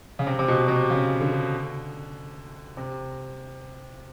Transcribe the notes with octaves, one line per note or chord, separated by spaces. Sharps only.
C#3
C3
C3
B2
C3
C#3
D3
C3